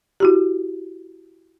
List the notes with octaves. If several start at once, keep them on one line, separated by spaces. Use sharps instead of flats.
E4 F#4 G4